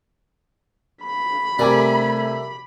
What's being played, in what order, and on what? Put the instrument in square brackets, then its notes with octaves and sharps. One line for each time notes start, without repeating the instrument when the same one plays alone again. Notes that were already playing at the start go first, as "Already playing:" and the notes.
[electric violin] B5
[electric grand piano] C3 G#5 D6 [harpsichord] G3 A#4 D5 [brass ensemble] A3 E5